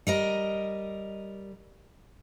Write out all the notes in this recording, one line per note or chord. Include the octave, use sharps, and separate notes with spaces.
G3 A#4 D#5